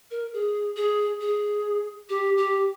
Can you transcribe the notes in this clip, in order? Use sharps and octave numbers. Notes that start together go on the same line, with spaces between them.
A#4
G#4
G#4
G#4
G4
G4